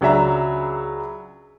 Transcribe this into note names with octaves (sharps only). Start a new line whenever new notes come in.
C#2 F#3 D4 E5 A#5